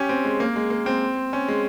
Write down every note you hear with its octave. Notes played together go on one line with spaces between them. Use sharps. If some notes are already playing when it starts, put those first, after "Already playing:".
Already playing: C#4 G4
C4
G#3
A#3
G#3
A#3
C4
C#4
G#3